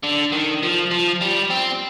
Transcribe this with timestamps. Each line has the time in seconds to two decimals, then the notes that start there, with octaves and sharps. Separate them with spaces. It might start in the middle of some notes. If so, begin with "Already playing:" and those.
0.04 D3
0.33 D#3
0.63 F3
0.91 F3
1.22 G3
1.51 C4